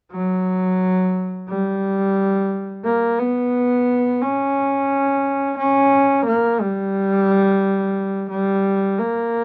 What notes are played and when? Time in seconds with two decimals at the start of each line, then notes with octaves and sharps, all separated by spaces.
0.12 F#3
1.49 G3
2.85 A#3
3.19 B3
4.22 C#4
5.58 C#4
6.26 A#3
6.60 G3
8.30 G3
8.99 A#3